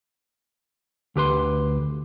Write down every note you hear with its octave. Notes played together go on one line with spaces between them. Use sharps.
D2 G4 B4 C6